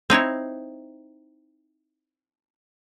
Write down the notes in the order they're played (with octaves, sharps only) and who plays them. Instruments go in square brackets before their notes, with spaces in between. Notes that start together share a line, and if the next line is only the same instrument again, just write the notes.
[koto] C4 D#4 E4 C#5